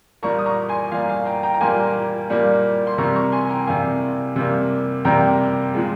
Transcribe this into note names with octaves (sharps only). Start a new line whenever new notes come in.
A#2 G3 A#3 A#5 C#6
D#6
A#5 C#6
G#5 C6
A#2 G3 A#3 F5 G#5
F5 G#5
G5 A#5
G5 A#5
A#5
A#2 G3 A#3 G#5 C6
A#2 G3 A#3
C6
C3 G3 A#3 A#5 C#6
A#5 C#6
G#5 C6
G#5
G5 A#5
C3 G3 A#3 F5 G#5
C3 G3 A#3
C3 G3 A#3 G5 A#5
A#2 F3 G#3